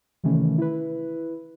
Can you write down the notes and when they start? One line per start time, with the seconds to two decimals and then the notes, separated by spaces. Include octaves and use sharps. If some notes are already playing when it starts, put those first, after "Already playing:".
0.24 C3 D#3 E3 A3 C#4
0.58 E4 B4